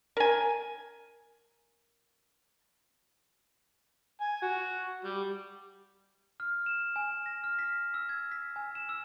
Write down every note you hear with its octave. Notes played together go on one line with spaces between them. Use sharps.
A#4 G#5
G#5
F#4
G3
F6
E7
G#5
A#6
F6
B6
E6
G#6
B6
G#5
E7
E6